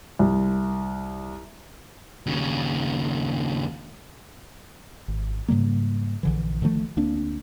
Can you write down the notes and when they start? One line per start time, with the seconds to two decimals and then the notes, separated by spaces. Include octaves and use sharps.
0.19 C2
2.27 D#2 C#3
5.08 G#1
5.48 G#2 C#3 G3 A#3
6.23 A#1 D3 E3
6.62 D3 D#3 F3 A3
6.97 D2 A#3 C4 D4